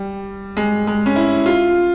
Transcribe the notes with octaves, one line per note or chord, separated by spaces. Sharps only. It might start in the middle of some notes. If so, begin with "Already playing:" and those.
Already playing: G3
G#3
G#3
C#4
E4
F4